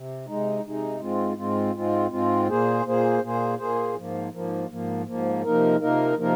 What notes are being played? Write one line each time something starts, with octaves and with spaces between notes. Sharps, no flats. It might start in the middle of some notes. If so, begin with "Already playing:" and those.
Already playing: C3
C3 G#3 D#4
C3 G#3 D#4
G#2 G#3 C4 F4
G#2 G#3 C4 F4
G#2 G#3 C4 F4
G#2 G#3 C4 F4
A#2 A#3 G#4 C5
A#2 A#3 G#4 C5
A#2 A#3 G#4 C5
A#2 A#3 G#4 C5
G#2 F3 A#3
G#2 F3 A#3
G#2 F3 A#3
G#2 F3 A#3
C3 F3 A#3 D#4 A#4
C3 F3 A#3 D#4 A#4
C3 F3 A#3 D#4 A#4